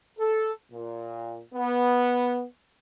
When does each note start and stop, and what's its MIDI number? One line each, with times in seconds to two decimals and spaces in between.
0.19 0.52 69
0.72 1.40 46
1.54 2.44 59